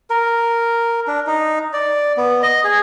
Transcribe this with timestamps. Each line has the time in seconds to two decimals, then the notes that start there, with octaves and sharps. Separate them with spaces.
0.10 A#4
1.07 D4
1.27 D#4
1.73 D5
2.17 B3
2.43 D#5
2.64 G#4